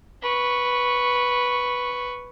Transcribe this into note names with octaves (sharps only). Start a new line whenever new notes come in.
B4 C#6